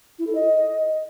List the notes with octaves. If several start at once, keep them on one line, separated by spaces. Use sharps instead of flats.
E4
A4
D#5